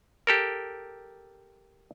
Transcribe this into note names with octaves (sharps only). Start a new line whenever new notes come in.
G4 A4 A#4